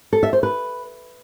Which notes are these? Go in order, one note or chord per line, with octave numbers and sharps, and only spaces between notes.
A4
E5
C5
B4